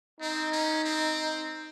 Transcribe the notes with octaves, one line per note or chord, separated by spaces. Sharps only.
C4 D#4
C#4
C4